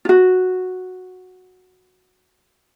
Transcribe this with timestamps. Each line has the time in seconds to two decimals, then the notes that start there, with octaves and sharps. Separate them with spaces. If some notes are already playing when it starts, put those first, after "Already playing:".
0.05 F4
0.09 F#4